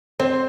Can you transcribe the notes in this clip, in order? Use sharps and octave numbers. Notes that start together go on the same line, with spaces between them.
C4 C5